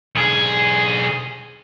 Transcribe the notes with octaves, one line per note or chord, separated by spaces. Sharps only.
B1 G#4